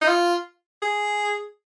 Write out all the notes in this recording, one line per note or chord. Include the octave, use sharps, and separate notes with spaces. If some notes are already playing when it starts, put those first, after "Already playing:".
D#4
F4
G#4